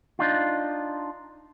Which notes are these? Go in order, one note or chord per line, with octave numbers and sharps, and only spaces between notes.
D4 D#4 F4